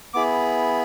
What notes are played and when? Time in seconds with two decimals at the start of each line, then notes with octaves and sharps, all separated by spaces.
0.14 B3 E4 G#4 D6